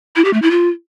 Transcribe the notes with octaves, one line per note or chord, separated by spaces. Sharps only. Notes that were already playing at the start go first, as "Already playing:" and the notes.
E4
G4
A3
E4
F4